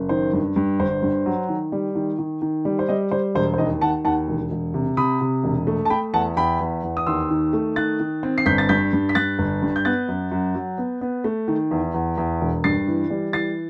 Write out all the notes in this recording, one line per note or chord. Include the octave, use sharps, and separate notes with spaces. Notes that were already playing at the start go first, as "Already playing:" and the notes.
Already playing: F#1
D#3 C5
G2
G2
G1 C5
G2
F#3
D#3
G3
D#3
D#3
D#3
G3
C5
G3 D#5
G3 C5
E1 C5
C5
D#2 D#5
D#3 F#5 A5
D#2 F#5 A5
E1
E1
C3
C3 B5 D#6
C3
E1
A3
A5
A3 G5 B5
E2 F#5 A5
E2 G5 B5
E2
E2
D#6
D#2 C6 E6
D#3
A3
D#3 F#6 A6
D#3
C4
C7
G1 G6 B6
A6
G2 G6 B6
G2
B6
G2 F#6 A6
G1
G2
G6
B3 F#6 A6
F#2
F#2
F#3
B3
B3
A3
D#3
E2
E2
E2
E1
G2 A6 C7
E3
G3
E3 A6 C7